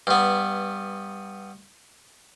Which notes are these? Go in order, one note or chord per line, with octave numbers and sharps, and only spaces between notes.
G2 B3